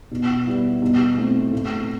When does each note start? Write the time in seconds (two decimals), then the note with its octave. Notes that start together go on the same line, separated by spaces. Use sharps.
0.11 B2
0.46 G3 B3 E4
0.82 B2
1.18 A3 C4 E4
1.52 A2